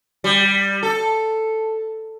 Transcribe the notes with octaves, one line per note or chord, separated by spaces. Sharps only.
G3
A4